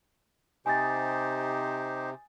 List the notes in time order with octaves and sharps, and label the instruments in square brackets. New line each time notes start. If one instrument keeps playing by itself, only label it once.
[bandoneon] C3 [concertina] D#4 G4 C5 [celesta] G#5 D#6 A6